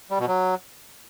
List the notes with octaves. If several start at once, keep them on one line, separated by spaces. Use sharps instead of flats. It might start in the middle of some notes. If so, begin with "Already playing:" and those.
G3
B2
F#3